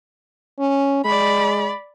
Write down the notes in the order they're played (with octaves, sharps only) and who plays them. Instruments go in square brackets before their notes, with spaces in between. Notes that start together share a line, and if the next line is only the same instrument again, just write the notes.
[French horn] C#4
[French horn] G#3 [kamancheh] D5 B5